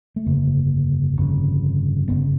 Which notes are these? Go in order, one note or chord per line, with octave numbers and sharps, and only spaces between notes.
A3
G1 F2 C#3 A#3
G1 F2 C#3
G1 F2 C#3 B3